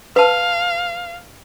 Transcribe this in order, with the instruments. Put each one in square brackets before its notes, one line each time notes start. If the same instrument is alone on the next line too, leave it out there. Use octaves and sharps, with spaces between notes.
[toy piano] B4 A5 [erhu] F5